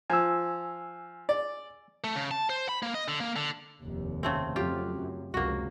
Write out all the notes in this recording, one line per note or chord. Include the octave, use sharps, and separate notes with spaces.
F3 G#5 E6
D5
A3
C#3
A5
C5
B5
A#3
D#5
D3
A#3
D3
F1 D#2
C#3 A3 C4
F2 F#3 F4 G4
F#2
F1 C#2 F#3 A#3 F#4